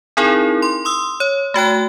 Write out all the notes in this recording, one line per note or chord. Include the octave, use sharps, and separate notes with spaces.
C4 D#4 E4 G#4 A#4
C6
C6 D#6 E6
C#5
A3 F#4 G5 F#6